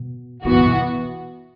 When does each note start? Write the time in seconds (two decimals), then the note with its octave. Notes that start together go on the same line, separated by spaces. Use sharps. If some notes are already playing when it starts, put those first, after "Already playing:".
Already playing: B2
0.45 D3 E3 B3 F#4
0.51 F#2
0.59 A2
0.66 B2